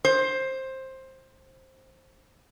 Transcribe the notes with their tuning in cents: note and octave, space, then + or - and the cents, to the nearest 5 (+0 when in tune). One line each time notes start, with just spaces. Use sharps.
C5 +15